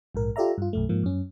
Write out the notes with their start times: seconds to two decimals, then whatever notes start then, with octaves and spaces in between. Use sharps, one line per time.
0.14 A#1 G#2 A#4
0.36 F4 G4 A4 D5 E5 A#5
0.58 G2 F4
0.73 B1 F#2 A3
0.89 G#2 F3 A#3
1.04 F#2 C#4